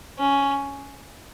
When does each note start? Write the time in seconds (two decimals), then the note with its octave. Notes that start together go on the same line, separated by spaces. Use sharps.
0.19 C#4